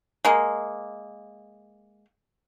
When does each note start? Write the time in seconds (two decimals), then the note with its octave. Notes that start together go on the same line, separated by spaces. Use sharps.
0.25 G#3 A#3